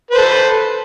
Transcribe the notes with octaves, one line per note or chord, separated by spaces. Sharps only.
A4 B4 C5